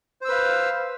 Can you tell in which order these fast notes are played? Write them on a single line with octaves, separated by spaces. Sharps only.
C5 E6 B4 F5